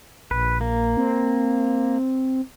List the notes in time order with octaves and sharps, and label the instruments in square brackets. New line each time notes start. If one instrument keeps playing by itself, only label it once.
[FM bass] A#1 [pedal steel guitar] B4
[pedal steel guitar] A#3
[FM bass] C4